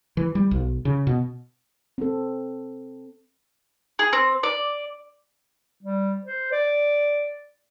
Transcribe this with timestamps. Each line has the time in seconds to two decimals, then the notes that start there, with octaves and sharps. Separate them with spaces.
0.17 E3
0.35 G3
0.51 B1
0.85 C#3
1.07 B2
1.98 C4 A4
3.99 G#4
4.13 C4
4.43 D5
5.83 G3
6.24 C5
6.52 D5